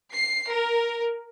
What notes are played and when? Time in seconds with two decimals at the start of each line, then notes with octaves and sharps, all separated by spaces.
0.13 C7
0.49 A#4